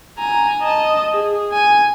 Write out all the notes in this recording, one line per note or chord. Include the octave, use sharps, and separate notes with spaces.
G#5 A#5
D#5 A5
G#4
G#5